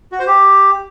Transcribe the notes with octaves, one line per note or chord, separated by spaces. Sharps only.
F#4
C5
G4